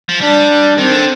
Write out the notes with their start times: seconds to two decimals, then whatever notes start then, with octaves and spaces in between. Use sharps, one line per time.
0.09 F3
0.20 G3 D4
0.78 D#3 C4
0.92 D3